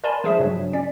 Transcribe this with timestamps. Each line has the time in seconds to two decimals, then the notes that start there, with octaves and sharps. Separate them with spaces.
0.04 A#4 D5 G#5 A5 B5 C6
0.24 F3 D4 G#4 E5 B6 E7
0.39 G2 C#3 F#3
0.73 C#4 D5 B6